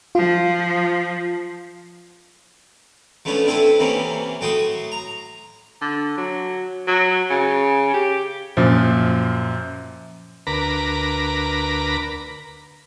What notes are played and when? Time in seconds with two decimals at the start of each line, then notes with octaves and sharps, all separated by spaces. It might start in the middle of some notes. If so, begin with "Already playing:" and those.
0.15 F3 F4
3.25 F3 A3 B3 C#4 D4
3.46 C4 D4 E4 A4 B4 C5
3.79 C3 E3 A#3 B3 C#4
4.41 A2 F#3 F#4 G5 C6 D#6
4.92 A#5
5.81 D3
6.17 F#3
6.87 F#3
7.30 C#3
7.94 G4
8.57 F#2 A#2 F3
10.47 D2 A#4 B4 A#5 B5 D6